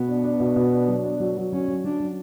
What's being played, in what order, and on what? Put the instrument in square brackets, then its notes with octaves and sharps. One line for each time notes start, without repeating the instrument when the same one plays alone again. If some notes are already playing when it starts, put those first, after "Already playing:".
Already playing: [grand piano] B2 [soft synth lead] B3
[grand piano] D4
D4
B2
B2
D4
F#3
D4
F#3
F#3
[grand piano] F#3 [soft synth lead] C#4
[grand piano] F#3
[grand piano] F#3 [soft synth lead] D4
[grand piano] F#3